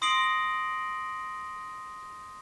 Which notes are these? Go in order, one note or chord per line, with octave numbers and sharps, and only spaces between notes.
C6 D#6 A#6 C7 D7 F#7